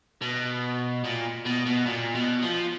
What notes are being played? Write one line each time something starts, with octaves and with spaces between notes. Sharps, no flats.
B2
A#2
B2
B2
A#2
B2
F3